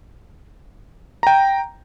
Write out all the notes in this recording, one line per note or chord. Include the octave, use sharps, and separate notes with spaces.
G5 A#5